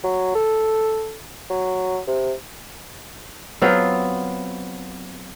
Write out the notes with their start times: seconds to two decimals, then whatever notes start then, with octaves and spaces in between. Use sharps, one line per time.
0.03 F#3
0.35 A4
1.50 F#3
2.07 C3
3.62 F#3 B3 C4 F4